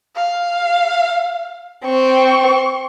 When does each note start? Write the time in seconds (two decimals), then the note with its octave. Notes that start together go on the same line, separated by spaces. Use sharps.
0.15 F5
1.85 C4 C#6